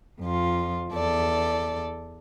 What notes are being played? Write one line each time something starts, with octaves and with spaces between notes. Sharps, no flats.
F2 F4
E2 A4 D5